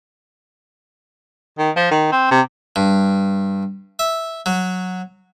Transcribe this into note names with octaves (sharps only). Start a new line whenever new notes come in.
D#3
F3
D#3
C4
C3
G2
E5
F#3